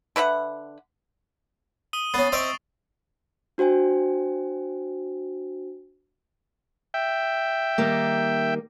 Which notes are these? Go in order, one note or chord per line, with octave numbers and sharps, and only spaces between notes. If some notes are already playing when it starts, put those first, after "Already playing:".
D3 B4 E5 F#5
D#6 D#7 G7
B3 C#4 A6 C7 D#7
C4 D#5 E5 C#6 D7 F7
D4 F#4 C5 G5 G#5
E5 G5
D#3 G3 A#3